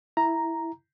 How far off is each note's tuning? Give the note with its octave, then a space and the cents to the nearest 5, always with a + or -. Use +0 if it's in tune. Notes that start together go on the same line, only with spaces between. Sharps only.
E4 +0 A#5 +0